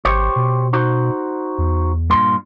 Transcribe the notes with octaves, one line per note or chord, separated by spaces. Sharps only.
G#1 G4 C5 C#5
B2
D#4 F#4 C5
E2
G2 A#2 C6